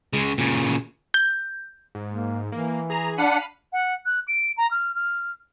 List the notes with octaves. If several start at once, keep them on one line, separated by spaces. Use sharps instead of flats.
C#3 G#3
A#2 C#3
G6
G#2
A#3
E3 A#3
G#4 A#5
D4 F5 F#5 B5 D#7
F#5
F#6
D7
A#5
F6
F6